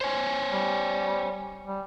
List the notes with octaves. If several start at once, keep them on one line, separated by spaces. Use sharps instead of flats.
C5 C#5 G#5
G3
G3